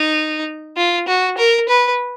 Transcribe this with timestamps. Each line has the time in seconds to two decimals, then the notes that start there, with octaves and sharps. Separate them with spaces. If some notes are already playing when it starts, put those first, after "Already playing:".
Already playing: D#4
0.77 F4
1.08 F#4
1.38 A#4
1.68 B4